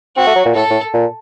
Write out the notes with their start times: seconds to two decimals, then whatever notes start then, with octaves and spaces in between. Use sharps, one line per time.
0.16 C4 F#4
0.27 A3
0.36 F#3
0.45 A#2
0.55 A2 A4
0.70 A2
0.94 A#2